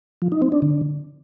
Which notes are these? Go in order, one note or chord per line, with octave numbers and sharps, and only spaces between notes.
F3
D#4
C4
D4
D3